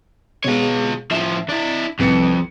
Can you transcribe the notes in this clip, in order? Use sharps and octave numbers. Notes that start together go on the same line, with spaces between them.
B2 G#3 F4 C#5
A2 F3 E5
D4 E4
C2 F2 B4 C#7